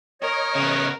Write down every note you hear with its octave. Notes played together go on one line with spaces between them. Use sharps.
A#4 C#5 D#5
C#3 B3